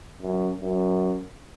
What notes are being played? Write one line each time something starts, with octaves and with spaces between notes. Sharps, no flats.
F#2
F#2